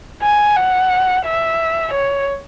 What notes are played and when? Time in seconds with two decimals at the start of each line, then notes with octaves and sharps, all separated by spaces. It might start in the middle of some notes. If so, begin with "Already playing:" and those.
0.22 G#5
0.57 F#5
1.26 E5
1.94 C#5